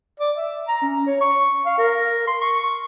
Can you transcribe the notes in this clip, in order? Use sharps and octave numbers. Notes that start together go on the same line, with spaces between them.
D5
E5
A#5
C#4
C#5
C#6
F5
A#4
C6
C#6